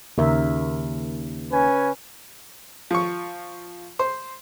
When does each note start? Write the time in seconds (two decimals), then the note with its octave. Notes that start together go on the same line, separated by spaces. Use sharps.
0.18 D#2 C#3 A#4 E5
1.52 C#4 B4 G#5
2.91 F3 C#6
3.99 C5